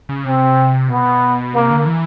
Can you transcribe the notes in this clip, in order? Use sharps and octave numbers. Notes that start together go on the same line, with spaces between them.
C#3
C3 C4
B2 B3
C3 A#3
D3
E3